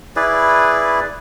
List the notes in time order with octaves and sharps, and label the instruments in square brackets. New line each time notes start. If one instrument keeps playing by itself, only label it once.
[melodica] E4 G#4 B4 D5